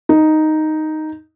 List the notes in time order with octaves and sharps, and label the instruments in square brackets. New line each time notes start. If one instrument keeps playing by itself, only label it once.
[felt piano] D#4